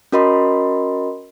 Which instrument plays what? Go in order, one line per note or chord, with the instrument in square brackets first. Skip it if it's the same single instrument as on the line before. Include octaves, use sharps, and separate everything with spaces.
[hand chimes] C#4 F#4 A#4 D#5 B5 C6